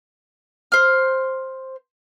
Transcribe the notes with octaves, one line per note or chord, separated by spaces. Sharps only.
C5 F6